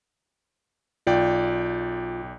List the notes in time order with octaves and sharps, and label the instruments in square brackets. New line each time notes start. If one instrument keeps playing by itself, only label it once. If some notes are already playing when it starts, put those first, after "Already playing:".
[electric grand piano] B1 D5 G5 [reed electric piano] F4